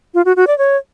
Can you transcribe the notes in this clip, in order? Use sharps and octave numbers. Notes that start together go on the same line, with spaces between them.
F4
F#4
F#4
D5
C#5